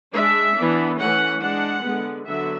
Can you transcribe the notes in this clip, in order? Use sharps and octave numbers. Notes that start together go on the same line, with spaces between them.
G#3 D4 E5
E3 B3 D4
E3 A3 C#4 F#5
G#3 D4 F#5
D3 G#3 B3
D3 F#3 B3 E5